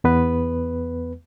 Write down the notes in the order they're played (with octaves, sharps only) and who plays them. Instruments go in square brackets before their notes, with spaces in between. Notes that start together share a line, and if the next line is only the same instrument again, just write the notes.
[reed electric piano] E2 B3 B4